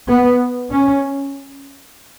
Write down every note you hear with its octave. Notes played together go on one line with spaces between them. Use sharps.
B3
C#4